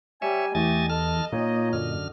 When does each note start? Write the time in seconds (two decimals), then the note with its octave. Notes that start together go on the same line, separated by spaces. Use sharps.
0.22 G3 C#5 E5 G#5
0.55 E2 A3 G4 D#5 G#5 A6
0.90 A4 D#5 A5 F6
1.32 A#2 A#3 D#4 C#5
1.73 F#2 D3 F6